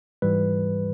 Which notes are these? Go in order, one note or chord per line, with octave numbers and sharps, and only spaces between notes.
G#2 E3 G3 B4